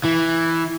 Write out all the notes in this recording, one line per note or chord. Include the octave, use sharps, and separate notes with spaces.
E3